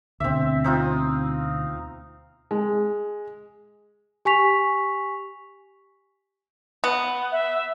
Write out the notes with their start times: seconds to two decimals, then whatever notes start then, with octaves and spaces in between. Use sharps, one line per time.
0.20 D2 B2 C4 E5
0.64 C4 D#4 F4
2.51 G#3
4.25 G4 G#5 C#6 B6 F7
6.84 B3
7.32 E5